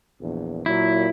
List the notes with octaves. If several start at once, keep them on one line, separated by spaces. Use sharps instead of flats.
A#1 E2
A#2 F#3 E4